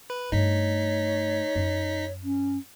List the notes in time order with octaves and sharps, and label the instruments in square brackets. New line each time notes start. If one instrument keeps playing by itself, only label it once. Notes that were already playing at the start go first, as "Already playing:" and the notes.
[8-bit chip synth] B4
[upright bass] G2 A3 [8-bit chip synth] D#4 B6 [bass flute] C#5
[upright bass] F#2
[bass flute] C#4